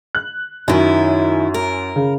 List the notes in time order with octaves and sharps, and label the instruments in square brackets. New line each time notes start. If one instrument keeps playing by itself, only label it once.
[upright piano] F#6
[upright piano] F#2 C#4 [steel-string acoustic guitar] D#3 E4
[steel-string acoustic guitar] A#4
[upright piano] C#3